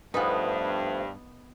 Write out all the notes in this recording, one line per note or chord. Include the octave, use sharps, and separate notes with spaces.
G2 F3 A3 B3 D#4 F4 G#4 B4